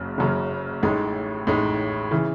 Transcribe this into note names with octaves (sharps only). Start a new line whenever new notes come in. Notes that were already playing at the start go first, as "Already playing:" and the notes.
Already playing: F#1 F#2 C#3
F#1 F#2 C#3
A1 A2 G#3 D#4
A1 A2 G#3 D#4
C#3 E3